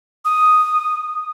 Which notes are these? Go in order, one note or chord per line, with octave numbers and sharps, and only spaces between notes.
D#6